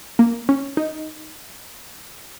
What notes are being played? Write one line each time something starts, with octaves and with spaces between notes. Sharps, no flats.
A#3
C#4
D#4